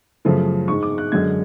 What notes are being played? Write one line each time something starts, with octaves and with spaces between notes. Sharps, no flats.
F#2 C#3 F3 A3
G#2 G#3 C#6
D6
F#6
F#2 D3 G#3 G#6